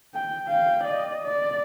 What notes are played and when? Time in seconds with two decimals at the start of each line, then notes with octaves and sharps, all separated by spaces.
0.14 G5
0.48 F5 G5
0.84 D5 D#5
1.24 D5